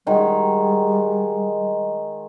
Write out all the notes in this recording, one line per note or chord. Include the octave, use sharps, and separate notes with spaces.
D#3 G3 G#3 F#4